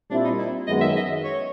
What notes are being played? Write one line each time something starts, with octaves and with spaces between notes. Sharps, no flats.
A#2 G3 C4 D4 E4
D#4
E4
F#2 D#3 G#3 B3 D#5
E5
D#5
C#5